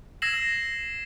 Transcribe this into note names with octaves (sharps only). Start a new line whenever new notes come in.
E6 G#6 A#6 C7 E7 F#7